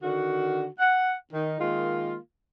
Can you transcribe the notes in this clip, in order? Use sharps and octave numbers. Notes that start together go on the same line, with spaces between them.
D3 D#3 F#4
F#5
D#3 D#4
D#3 G#3 A#3 F4